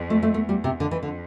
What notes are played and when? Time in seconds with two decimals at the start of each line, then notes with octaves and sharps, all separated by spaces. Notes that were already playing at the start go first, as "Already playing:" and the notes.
Already playing: F2
0.10 A3
0.23 A3
0.34 E2 A3
0.49 G3
0.64 C3
0.80 F2 D3
0.91 E3
1.03 D3